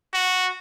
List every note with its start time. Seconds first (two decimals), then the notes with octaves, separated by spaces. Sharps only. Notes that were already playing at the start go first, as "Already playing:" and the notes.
0.14 F#4